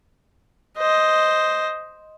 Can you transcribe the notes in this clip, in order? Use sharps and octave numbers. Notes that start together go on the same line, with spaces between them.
C5 D#5